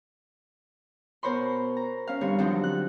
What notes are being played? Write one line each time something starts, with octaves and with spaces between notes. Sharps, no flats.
B2 A#4 C5 C#5 B5 C6
A#5
C#4 F5
G2 D3 C4 C#5
D3 F3 F#3 C4 D4 D#4
F#6